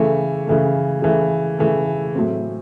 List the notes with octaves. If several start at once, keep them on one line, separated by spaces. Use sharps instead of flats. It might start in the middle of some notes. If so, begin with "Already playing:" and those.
Already playing: C#3 E3 A3
C#3 E3 A3
C#3 E3 A3
C#3 E3 A3
A2 F#3 C4